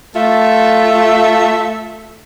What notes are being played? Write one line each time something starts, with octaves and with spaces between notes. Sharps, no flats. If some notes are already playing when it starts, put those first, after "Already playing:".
A3 F4 A4 E5